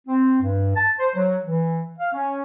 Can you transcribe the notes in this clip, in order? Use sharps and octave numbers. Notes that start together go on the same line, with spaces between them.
C4
G2
A5
C5
F#3
E3
F5
C#4